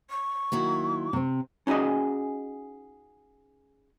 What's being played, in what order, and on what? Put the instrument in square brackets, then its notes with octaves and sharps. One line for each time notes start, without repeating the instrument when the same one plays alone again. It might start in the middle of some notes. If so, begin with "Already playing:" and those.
[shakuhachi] C#6
[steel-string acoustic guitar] D#3 F#3 E4 [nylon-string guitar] A#3
[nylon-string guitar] C3 C4
[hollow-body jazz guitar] C#4 D#4 F#4 G#4 D#5